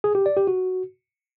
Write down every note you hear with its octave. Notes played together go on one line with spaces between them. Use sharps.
G#4
G4
D5
G4
F#4